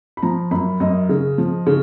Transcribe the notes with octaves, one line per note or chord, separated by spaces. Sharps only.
B5
F3 A#5
F#2 B5
F#2 D#5
C#3
F3
C#3